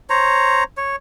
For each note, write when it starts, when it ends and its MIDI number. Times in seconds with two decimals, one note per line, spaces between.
0.10 0.63 72
0.10 0.63 73
0.10 0.63 82
0.77 0.96 73